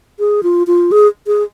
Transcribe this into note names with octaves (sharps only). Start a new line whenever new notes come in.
G#4
F4
F4
G#4
G#4